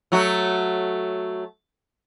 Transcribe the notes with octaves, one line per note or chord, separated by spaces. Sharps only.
F#3 A3 F#4